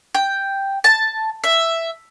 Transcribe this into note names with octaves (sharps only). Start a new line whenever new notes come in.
G5
A5
E5